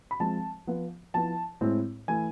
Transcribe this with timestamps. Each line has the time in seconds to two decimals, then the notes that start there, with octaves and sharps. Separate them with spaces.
0.11 B5
0.20 F3 G#3 C4 A5
0.67 F3 B3 F4
1.14 F3 B3 E4 A5
1.61 A2 G#3 C4 E4
2.08 E3 A3 E4 G#5